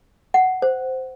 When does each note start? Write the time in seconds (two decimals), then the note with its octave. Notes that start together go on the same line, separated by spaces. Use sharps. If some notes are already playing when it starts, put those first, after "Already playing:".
0.34 F#5
0.62 C5